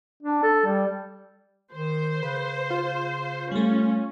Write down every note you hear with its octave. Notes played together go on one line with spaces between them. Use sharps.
D4
A4
G3
D#3 C5
C#3 B4
F4
G3 A3 C#4